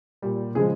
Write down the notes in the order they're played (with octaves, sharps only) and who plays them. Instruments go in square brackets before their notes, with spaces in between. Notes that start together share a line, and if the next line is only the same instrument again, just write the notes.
[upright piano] A#2 G3
C#3 F3 G#3 G#4